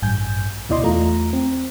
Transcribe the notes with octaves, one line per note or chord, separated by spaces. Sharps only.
A1 G2 G#5 G6
D2 B2 E4 D5 D#5 C6
E2 A3 F4 A#5
C4